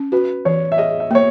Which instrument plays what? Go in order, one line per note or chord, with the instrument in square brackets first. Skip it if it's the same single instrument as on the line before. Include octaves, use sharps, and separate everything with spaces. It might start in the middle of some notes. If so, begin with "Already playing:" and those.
Already playing: [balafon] C#4
[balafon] F#4 [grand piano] B4
[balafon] E3 [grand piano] C#5
[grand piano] E5
[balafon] G#4 [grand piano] D#5
[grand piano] E5
[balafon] A#3 [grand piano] C#5